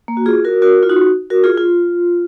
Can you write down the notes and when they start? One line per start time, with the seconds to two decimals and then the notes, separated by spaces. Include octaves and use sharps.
0.08 A#3
0.17 F#4
0.26 F4 G#4
0.45 F#4 A#4
0.62 F#4 A#4
0.83 F4
0.89 D#4 F#4
1.30 F#4 A#4
1.44 F4 G#4
1.58 F4